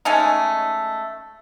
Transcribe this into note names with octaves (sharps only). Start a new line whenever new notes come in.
G#3 A3 C#4 D#4